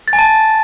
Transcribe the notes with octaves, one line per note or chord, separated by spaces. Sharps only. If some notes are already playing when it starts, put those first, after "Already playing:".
A6
G#5
A5